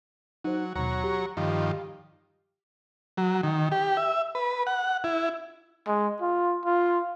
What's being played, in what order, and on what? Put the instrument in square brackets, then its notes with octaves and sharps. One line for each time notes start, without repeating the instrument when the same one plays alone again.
[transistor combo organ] F#3 [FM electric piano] D#4 C5
[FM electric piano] D#2 B2 [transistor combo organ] F#3 C#5 A#5
[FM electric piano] G4
[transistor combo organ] G2 D#3 F3
F#3
D#3
G4
E5
B4
F#5
E4
[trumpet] G#3
F4
F4